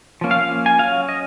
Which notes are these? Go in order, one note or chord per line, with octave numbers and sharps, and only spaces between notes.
F3 A#3 C#4
F5
F5
G#5
F#3 C#4 F5
D#5